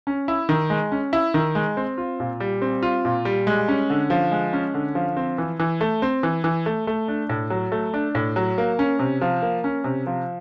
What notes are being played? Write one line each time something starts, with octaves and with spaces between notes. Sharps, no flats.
C#4
E4
D#3
G#3
C#4
E4
D#3
G#3
C4
F4
A#2
G3
C4
F4
A#2
G3
G#3
C#4
D3
F3
G#3
C#4
D3
F3
C4
E3
E3
A3
C4
E3
E3
A3
A3
D4
A2
F#3
A3
D4
A2
F#3
A#3
C#4
C3
F3
A#3
C#4
C3
F3